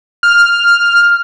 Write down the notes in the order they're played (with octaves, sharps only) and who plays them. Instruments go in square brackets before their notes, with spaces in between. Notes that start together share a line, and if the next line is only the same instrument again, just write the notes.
[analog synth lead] F6